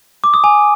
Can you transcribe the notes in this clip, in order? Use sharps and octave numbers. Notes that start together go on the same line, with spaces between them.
D6
D#6
G#5